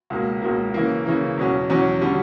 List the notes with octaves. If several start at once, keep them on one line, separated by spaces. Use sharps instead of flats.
C#2 B2 A#3
C#2 B2 A#3
C#3 E3 A#3
C#3 E3 A#3
E2 B2 F#3 C#4
E2 B2 F#3 C#4
D3 G3 C#4